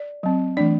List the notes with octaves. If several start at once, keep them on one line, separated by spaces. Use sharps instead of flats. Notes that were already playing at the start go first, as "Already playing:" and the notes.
Already playing: D5
F#3 C4
E3 A3 D4 D5